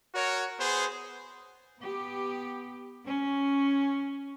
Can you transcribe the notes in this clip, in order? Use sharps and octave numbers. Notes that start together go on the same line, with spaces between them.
F#4 A#4 C#5
B3 G#4 C5
B3 G4
C#4